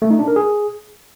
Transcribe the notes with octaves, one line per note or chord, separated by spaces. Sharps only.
A3
D#4
D4
A#4
G#4